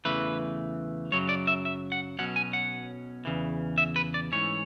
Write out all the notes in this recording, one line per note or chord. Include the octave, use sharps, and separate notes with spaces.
E2 C#3 E3 A3 B4
F#2 C#3 F#3 C#5
D5
E5
E5
F#5
B1 B2 F#3 C#4 F#5
G#5
F#5
E2 C#3 E3
E5
B4
D5
G#2 E3 A3 C#4 C#5